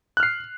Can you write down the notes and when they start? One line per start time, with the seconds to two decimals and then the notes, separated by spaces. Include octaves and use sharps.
0.17 F#6
0.20 F6
0.23 C7